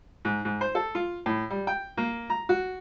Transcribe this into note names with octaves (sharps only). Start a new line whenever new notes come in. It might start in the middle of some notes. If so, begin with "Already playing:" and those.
G#2
G#2
C5
A4
F4
A2
G3
G5
A#3
A#5
F#4